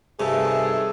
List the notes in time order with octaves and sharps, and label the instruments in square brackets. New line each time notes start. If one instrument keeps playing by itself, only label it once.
[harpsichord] G2 C3 [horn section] D#3 A3 [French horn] G#4